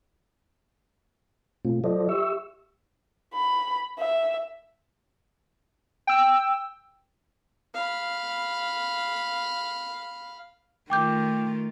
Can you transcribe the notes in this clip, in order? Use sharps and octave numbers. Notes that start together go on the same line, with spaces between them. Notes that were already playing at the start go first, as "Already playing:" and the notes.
B2 A3 C4 F4
F#3 F4 A4 C5 D5 D#5
G4 E5 C#6 E6
B5
E5
G5 E6
F5 B5
D#3 A3 F4 G5 D6 G6